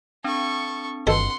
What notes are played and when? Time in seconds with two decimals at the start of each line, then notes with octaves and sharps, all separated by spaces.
0.24 C4 D4 A4 C#6
1.07 G1 B2 D#3 A4 F#5 C6